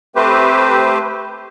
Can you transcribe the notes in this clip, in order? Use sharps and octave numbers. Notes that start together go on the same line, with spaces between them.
A3 C4 G4 B4 C5